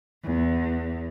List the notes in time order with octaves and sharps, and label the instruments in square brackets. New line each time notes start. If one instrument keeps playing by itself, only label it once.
[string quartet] E2